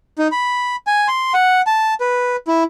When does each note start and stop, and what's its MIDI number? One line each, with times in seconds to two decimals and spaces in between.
0.18 0.28 63
0.32 0.76 83
0.87 1.08 80
1.08 1.33 84
1.34 1.62 78
1.67 1.94 81
2.00 2.36 71
2.48 2.64 64